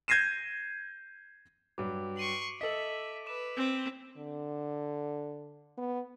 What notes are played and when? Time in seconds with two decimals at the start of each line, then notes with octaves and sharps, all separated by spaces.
0.08 G6 G#6 A#6 C7 D#7 E7
1.78 G2 F#3 D6
2.17 C6 C#6 D7 D#7 F#7
2.61 A4 D#5 E5 B6 F#7
3.27 B4 D6 E7
3.57 C4
4.16 D3
5.77 B3